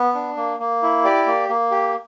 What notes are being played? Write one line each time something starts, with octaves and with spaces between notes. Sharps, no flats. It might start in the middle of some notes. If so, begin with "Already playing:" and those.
Already playing: B3
D4
A#3
A#3
E4
G4 D5
A#3
A#3
G4